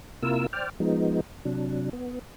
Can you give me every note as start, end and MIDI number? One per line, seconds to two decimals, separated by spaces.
0.23 0.47 48
0.23 0.47 58
0.23 0.47 64
0.23 0.47 65
0.23 0.47 70
0.23 0.47 88
0.53 0.69 72
0.53 0.69 74
0.53 0.69 79
0.53 0.69 89
0.80 1.20 53
0.80 1.20 56
0.80 1.20 59
0.80 1.20 63
1.45 1.89 48
1.45 1.89 54
1.45 1.89 62
1.93 2.19 59